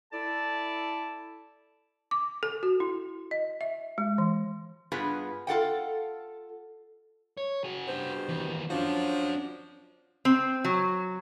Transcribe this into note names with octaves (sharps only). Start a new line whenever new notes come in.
E4 A4 D5 A5
D6
A4
F#4
E4
D#5
E5
G#3
E3
G2 B3 F4 G#4 B4
F4 A4 F#5 G5
C#5
F#4 G#4
G2 B2 C5
D#2 E3
F3 C#4 D4 F#4
C4
F#3